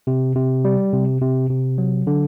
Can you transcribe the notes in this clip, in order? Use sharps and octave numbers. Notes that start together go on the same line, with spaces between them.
C3
C3
G3
C3
C3
C3
F#3
D3